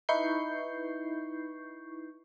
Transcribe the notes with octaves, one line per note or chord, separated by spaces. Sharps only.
D#4 E4 B4 C#6 G6 C7